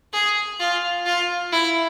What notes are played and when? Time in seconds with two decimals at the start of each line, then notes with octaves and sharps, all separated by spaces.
0.13 G#4
0.60 F4
1.06 F4
1.52 E4